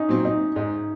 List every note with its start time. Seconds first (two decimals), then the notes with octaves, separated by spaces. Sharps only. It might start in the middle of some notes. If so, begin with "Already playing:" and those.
Already playing: C#4 D#4
0.09 A#2 F#3 C4
0.25 D#4
0.56 G#2 D#4